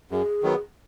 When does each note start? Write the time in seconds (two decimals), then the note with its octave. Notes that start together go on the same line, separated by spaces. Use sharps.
0.11 F#2 G#4
0.43 D#3 F#3 B3